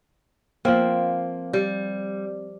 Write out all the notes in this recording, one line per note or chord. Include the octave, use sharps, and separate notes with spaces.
F3 A#3 C4
G3